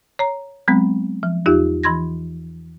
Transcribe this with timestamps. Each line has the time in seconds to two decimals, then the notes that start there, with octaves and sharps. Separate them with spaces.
0.19 C#5 A#5
0.68 F#3 G#3 B3 C4
1.23 F3
1.46 E2 D#4 F4 G4
1.83 E3 B5 C6 G#6 A#6